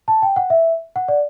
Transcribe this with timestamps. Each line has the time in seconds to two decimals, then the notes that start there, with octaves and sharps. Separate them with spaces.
0.08 A5
0.22 G5
0.36 F#5
0.50 E5
0.96 F#5
1.08 D5